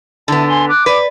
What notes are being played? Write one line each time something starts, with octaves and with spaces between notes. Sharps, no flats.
D3 B3 E4 A5
G#5 C6
D6 F#6
B4 D5